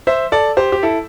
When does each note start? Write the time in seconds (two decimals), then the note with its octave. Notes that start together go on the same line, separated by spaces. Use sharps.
0.07 C5 E5
0.32 A4 D5
0.57 G4 C5
0.72 G4
0.83 E4 A4